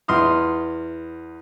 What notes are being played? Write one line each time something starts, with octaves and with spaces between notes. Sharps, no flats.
E2 C6 D#6 F6